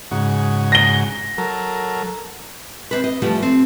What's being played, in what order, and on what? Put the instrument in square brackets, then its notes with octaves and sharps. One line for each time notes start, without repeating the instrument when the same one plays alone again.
[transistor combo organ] G#2 C#3 F#4
[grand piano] A#6 G7
[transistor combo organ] F#3 A4 A#4
[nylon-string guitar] C4 D4 B4
D#5
E3 F3 G3 A3 B3
C4